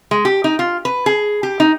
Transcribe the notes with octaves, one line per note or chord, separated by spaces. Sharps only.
G#3
G4
D#4
F4
B4
G#4
G4
D#4